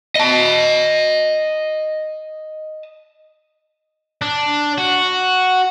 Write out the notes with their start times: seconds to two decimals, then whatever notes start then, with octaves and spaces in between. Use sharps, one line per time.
0.16 D#5 A5
4.22 D4
4.78 F#4